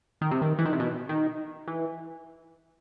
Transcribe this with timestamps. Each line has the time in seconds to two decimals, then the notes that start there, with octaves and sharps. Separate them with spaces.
0.21 D#3
0.31 C3
0.42 D#3
0.59 E3
0.65 D#3
0.73 C3
0.80 B2
1.09 D#3
1.67 E3